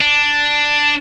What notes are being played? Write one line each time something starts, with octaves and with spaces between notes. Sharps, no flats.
D4